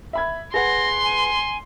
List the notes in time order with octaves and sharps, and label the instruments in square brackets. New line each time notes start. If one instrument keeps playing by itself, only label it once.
[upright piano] E5 B5 G#6
[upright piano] G#4 B4 F#5 [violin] C6 [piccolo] A#6
[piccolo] G#5